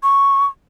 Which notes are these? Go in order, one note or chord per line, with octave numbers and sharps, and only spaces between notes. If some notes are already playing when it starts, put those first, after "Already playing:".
C#6